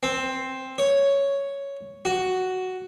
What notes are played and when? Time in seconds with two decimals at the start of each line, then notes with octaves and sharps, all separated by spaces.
0.03 C4
0.78 C#5
2.05 F#4